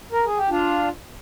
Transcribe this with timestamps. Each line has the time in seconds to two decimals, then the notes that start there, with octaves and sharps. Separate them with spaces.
0.12 A#4
0.25 G#4
0.37 G4
0.50 D4 F4